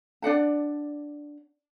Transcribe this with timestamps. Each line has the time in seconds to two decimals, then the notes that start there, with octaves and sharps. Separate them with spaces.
0.22 D4 D5 F#5 A5